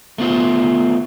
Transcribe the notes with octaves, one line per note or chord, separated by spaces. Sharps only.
A3 B3 F4 C5